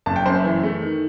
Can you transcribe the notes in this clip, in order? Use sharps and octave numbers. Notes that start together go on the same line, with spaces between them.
F#1 A5
G5
F#2 C5
E5
E3
A3
D#3